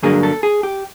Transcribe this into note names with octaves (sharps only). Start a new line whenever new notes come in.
G2 D3 F#3 A#3 D4 G#4
A4
G#4
G4